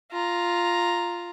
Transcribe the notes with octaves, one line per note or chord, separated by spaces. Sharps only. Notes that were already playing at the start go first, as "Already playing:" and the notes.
F4 A#5